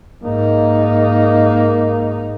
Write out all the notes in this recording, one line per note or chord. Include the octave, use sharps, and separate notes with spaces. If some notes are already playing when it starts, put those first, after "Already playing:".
G#2 A#3 D#4